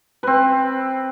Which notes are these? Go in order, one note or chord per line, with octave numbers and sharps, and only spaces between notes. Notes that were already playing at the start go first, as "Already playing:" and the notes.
C4 B4